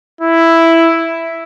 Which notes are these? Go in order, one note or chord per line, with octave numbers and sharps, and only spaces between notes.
E4